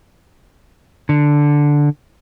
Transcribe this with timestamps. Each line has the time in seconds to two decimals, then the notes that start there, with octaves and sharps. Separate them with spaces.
1.09 D3